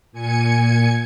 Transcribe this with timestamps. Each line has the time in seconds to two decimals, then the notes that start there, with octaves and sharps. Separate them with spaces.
0.12 A#2 G#5 G#6 C#7